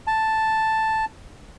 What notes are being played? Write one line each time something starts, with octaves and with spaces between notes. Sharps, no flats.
A5